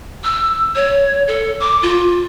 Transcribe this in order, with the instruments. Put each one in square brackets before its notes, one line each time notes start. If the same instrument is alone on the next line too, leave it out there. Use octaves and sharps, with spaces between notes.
[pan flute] E6
C#5
A4
D6
F4